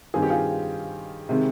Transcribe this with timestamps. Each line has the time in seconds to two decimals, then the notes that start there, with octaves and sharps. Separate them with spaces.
0.14 G2 D#3 G3 C4 G#4
0.23 G4
0.30 F4 G#4
1.29 C3 D#3 G#3 C4